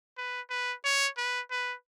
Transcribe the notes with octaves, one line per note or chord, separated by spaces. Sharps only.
B4
B4
C#5
B4
B4